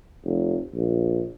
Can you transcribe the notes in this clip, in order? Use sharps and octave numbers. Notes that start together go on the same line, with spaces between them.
F1
A#1